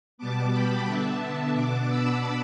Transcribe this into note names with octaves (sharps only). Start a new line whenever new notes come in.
B2 G3 B3 A5 D6
G5 B5
D3 B3 D4 E5 A5
B2 B3 D4 A5 D6
B5 E6